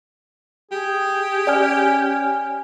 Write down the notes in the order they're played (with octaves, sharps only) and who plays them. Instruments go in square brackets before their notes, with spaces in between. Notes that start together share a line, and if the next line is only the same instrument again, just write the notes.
[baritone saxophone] G4 [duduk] G#4
[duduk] C#4 [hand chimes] D5 G#5 F6